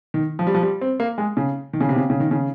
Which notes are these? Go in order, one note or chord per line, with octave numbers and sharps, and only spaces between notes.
D#3
F3
G3
F3
G3
C4
A#3
G#3
C#3
D#3
C#3
C3
C#3
C#3
D#3
C#3